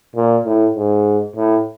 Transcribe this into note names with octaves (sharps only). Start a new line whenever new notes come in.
A#2
A2
G#2
A2